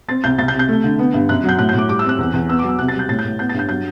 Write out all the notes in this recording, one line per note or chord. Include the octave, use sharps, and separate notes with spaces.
C4 A6
C2 G6
C2 A6
G6
C3
G6
A3
D3
B3
G2
F#2 F#6
F#3
G6
A2 F#6
G6
A2 D6
G3 D6
E6
C4 F#6
E2
E2
B3 E6
D6
F#3
E6
C3 F#6
A6
G3
G6
A2 A6
G6
A2
B3 G6
A6
G2 G6
F#3 G6